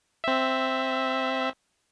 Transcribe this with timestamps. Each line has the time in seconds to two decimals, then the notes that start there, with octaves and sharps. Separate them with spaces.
0.24 C4 E5